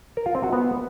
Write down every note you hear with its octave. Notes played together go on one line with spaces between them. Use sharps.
A#4
F4
C4
F#4
B3